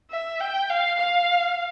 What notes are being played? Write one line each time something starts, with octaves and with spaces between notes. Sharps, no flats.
E5
G5
F5
F5